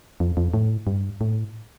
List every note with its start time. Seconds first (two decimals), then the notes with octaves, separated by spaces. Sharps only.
0.20 F2
0.37 F2
0.54 A2
0.87 G2
1.21 A2